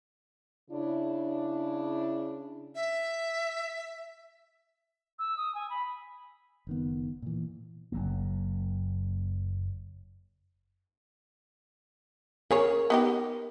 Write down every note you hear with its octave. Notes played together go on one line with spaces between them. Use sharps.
C#3 D4 E4
E5
E6
D#6
G#5
B5
F#1 D#3 B3
A#2 E3
F#1 F#3 A#3
C#3 G#4 A#4 C#5
B3 D#4 G4